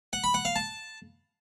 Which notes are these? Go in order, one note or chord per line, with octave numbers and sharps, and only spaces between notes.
F#5
B5
F#5
F5
A5